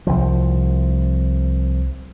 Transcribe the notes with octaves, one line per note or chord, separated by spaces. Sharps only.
C2 F3